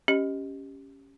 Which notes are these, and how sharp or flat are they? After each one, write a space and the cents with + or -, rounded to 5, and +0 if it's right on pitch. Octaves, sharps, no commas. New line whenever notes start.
C#4 +0 G4 +0 D#5 +0